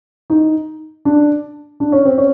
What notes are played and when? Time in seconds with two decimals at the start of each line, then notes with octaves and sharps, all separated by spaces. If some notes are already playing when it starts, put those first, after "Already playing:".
0.30 D#4
1.05 D4
1.80 D4
1.92 C#4
2.05 C4
2.18 C#4